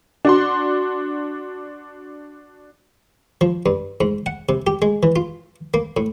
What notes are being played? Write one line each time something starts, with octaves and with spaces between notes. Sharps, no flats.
D4 F#4 C6
F3
G2
G#2
F#5
C3
G4
G#3
E3
F4
A#3
A2